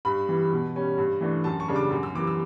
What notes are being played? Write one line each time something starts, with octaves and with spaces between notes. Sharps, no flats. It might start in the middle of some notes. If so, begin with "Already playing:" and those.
G2 B5
E3 G3
B2
G3 C#4
G2
E3 A3 D4
F#2 A5
C#6
C#3 G3 D4
D6
F#2
E6
E3 G3 D6
E6